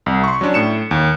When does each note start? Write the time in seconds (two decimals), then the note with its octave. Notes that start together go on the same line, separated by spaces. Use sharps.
0.06 C2
0.24 C6 C#6
0.41 F#3 C#4 D4
0.54 A2 C#7 E7
0.91 D#2